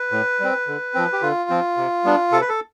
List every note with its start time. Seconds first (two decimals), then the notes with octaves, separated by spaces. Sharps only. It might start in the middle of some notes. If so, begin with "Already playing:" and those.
Already playing: B4
0.12 A2
0.40 G3 C4
0.67 D3
0.95 F3 C4
1.13 G4
1.22 D3 F4
1.50 F3 C4
1.77 C3
2.05 G3 B3 D4
2.32 C3 A4
2.41 B4
2.49 A4